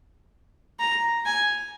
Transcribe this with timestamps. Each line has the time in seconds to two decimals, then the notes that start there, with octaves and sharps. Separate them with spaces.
0.79 A#5
1.25 G#5